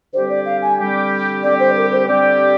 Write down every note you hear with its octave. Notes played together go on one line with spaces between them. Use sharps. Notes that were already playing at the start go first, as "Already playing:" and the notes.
D3 G3 C4 G4 C5
D5
F5
G#5
D3 G3 C4 G4
D3 G3 C4 G4 D5
C5
A#4
C5
D3 G3 C4 G4 D5